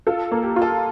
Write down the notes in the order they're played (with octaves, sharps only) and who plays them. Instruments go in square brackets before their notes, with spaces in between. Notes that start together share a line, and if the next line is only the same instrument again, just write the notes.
[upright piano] F4 [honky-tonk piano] A4
[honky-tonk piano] A#3
[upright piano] G4
[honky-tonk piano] F4
[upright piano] A4